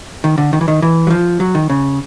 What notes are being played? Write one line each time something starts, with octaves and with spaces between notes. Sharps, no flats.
D#3
D3
D#3
E3
D#3
E3
F#3
F3
F#3
D#3
C#3